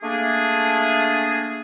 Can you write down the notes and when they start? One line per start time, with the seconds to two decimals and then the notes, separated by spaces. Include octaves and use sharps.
0.02 A3 A#3 D4 G#4